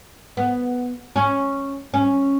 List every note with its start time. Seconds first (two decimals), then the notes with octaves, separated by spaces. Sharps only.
0.37 B3
1.16 C#4
1.94 C#4